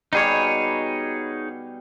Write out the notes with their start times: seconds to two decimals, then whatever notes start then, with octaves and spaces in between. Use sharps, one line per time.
0.13 B2 G3 D#4 G#4 C#5